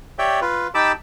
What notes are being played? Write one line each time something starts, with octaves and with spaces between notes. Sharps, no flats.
G4 C#5 D5 E5 G5
F4 B4
D#4 G4 A5 B5 D6 E6